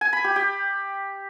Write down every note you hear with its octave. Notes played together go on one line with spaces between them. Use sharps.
G#5
B5
G4
G4